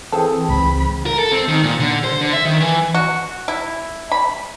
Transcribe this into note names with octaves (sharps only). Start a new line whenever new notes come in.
E3 C4 G#4 A4
C#2 G#2 B5
A#4
A4
C4
D#3
A#2
D3
C5
D3
E5
D#3
E3
F#4
E4
B5